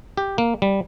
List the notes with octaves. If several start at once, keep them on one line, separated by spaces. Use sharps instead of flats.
G4
A#3
G3